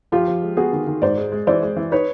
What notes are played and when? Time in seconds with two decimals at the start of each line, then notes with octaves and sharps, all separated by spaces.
0.12 F3 F4 G4
0.27 F3
0.42 G#3
0.57 B3 F#4 G#4
0.73 D#3
0.87 D#3
1.02 G#2 C5 D5
1.17 G#3
1.32 G#3
1.47 E3 C5 D5
1.63 G#3
1.77 E3
1.92 D#4 B4 C#5